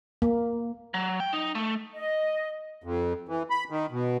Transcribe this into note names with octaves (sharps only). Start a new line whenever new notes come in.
A#3
F#3
G5
D#4
A3
D#5
F2
E3
B5
D#3
B2